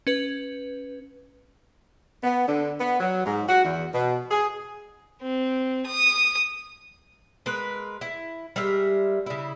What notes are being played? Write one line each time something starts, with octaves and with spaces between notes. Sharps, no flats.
C#4 B4
B3
D3
B3
F#3
G#2
F#4
E2
B2
G#4
C4
D#6
G#3 A#4 B4
E4
G3 G#3 A#4 E5
C#3 E4